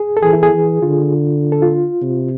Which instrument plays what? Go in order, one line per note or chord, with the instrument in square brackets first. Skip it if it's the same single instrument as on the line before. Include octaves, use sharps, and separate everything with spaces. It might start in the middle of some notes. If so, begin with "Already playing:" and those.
Already playing: [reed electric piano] G#4
A4
[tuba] E3 [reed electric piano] G#4
[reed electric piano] E4
G#4
[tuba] E3
[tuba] D3 [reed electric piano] F4
[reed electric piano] A4
F4
[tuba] C3